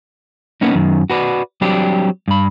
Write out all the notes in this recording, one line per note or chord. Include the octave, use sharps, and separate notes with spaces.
A#3 B3 C#4 D#4
F#2 D#3
F#4 B4 C#5 D5
F#3 G3 C4 D4 G4
G2 B5